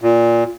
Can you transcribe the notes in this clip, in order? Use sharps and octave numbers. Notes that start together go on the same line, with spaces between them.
A#2